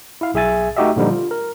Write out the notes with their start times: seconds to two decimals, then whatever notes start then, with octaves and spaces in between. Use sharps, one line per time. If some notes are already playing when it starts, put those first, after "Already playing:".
0.21 E4 F5
0.34 B1 G#4 E5 G#5 A6
0.77 A3 D#4 F#4 G4 D#5 E5
0.96 A#2 D3 F3 G3 D#4
1.10 F4
1.31 A#4